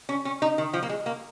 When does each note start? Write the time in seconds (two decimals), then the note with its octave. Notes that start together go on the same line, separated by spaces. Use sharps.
0.09 C#4
0.25 C#4
0.42 D#4
0.58 D#3
0.73 F3
0.83 A#3
0.89 G#3
1.06 A#3